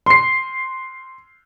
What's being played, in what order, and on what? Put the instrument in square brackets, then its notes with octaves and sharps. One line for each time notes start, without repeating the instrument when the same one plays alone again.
[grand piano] C6 C7